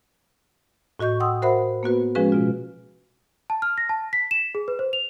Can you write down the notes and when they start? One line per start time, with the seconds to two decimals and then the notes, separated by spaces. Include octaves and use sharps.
0.99 A2 F#4 D#5 C#6 G6
1.20 F#5 G5 C6 D#6 E6
1.42 F#4 A#4 C5 E5 F#5 B5
1.83 A#3 B3 F#4 B4
2.15 F3 G#3 C#4 F#4 G#4 B4
2.32 B2 F4
3.50 A5
3.62 F6
3.78 A#6
3.89 A5
4.13 B6
4.31 E7
4.55 G#4
4.68 B4
4.79 C5
4.93 F7